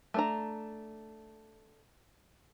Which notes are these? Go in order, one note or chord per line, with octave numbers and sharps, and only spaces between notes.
A3 D4 A#5